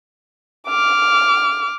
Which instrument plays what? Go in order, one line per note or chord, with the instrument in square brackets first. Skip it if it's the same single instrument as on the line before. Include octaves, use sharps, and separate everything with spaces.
[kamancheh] D6 F6